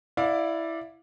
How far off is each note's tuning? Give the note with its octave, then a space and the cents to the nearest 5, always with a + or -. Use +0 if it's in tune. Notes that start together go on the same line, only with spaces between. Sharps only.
E4 +0 D5 +0 F5 +30